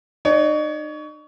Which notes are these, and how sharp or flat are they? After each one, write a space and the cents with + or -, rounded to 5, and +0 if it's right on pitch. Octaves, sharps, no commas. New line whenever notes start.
D#4 -40 C#5 +30